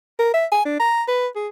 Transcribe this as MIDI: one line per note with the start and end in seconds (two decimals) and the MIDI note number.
0.19 0.32 70
0.34 0.46 76
0.52 0.65 80
0.65 0.79 62
0.80 1.03 82
1.08 1.27 71
1.36 1.48 68